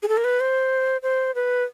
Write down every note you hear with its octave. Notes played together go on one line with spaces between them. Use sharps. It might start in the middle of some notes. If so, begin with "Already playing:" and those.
G#4
A4
A#4
B4
C5
C5
B4